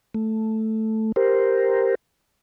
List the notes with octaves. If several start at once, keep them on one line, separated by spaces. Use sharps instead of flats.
A3
G4 A#4 C5